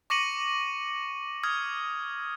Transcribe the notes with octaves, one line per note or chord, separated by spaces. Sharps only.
C#6 D6 A#6 C#7 D#7 F#7
D#6 F6 G#6